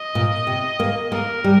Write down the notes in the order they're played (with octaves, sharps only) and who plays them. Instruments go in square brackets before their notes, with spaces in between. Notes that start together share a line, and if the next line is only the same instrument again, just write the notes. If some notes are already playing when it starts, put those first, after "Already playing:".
Already playing: [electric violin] D#5
[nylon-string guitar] A#2
C3
A#3
[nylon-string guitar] A#3 [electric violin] A#4
[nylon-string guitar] G3